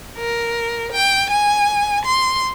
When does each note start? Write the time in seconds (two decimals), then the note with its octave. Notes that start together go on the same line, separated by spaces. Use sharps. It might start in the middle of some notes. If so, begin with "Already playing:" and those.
0.17 A#4
0.92 G5
1.30 G#5
2.05 C6